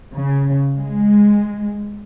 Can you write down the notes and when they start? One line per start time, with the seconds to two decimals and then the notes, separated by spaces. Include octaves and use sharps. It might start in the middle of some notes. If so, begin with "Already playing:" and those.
0.13 C#3
0.78 G#3